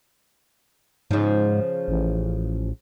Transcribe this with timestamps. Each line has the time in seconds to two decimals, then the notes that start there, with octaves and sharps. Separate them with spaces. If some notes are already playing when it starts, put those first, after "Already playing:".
1.11 G#2 C#3 F3
1.88 A1